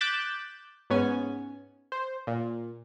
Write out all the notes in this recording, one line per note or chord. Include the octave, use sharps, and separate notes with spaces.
D6 F#6 G6 A6 B6 E7
G#2 B3 C#4 G#5
C5
A#2